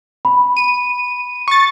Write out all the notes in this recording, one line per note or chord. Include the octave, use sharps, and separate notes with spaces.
B5
D#7
C#6 A6